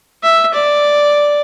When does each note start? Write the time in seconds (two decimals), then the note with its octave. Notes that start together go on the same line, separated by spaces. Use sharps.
0.23 E5
0.54 D5